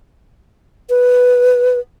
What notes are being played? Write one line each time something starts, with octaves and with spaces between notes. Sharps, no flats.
B4